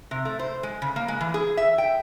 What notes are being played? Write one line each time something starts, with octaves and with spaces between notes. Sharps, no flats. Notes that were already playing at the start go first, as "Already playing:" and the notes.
C3
A3
C5
G#3
C#3
A#3
G#3
E3
G#4
E5
G5